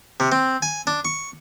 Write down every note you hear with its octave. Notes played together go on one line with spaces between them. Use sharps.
C3
C4
G#5
D4
C#6